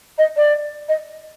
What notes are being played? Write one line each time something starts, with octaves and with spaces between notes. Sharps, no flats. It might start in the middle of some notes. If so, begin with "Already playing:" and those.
D#5
D5
D#5